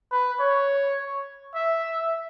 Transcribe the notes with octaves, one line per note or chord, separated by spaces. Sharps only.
B4
C#5
E5